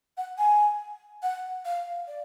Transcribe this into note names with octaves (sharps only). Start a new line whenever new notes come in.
F#5
G#5
F#5
F5
D5